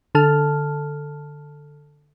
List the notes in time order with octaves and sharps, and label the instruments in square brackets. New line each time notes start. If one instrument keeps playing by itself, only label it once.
[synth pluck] D3 A4 A5 F6